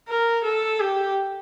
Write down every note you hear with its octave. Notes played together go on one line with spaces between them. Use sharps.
A#4
A4
G4